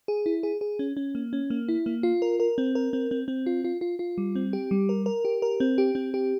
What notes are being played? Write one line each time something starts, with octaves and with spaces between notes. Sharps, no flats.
G#4
E4
G#4
G#4
C#4
C#4
A#3
C#4
A#3
E4
A#3
F4
A#4
A#4
C4
A#4
C4
C4
C4
F4
F4
F4
F4
G3
C4
G4
G3
A#4
A#4
G4
A#4
C4
G4
C4
G4